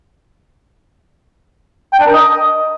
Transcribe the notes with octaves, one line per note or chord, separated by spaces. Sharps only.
G5
D4
A#4
D#5